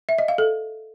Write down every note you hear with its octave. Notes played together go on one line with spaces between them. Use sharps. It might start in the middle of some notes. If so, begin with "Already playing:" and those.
E5
D#5
F5
A4